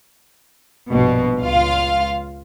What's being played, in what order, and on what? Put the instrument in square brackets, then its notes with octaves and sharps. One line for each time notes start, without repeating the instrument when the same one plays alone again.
[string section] A#1 G2 B2
C#2 F4 F5